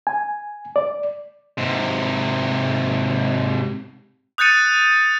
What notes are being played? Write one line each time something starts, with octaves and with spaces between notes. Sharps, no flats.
G#5
D5
G#2 C3
D#6 F#6 G6 A6 C#7 D#7